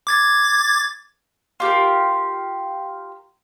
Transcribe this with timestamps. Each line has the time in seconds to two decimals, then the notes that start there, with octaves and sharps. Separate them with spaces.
0.07 D6 G#6 A6
1.60 F4 G4 A#4